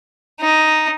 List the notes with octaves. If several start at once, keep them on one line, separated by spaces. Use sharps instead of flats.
D#4